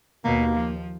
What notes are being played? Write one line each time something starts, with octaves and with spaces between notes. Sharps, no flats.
D#2 B2 A#3
F3